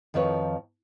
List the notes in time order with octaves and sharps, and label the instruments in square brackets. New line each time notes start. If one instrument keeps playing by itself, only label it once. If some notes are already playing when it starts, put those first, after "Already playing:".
[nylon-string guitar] F2 D#3 F3 B4 C#5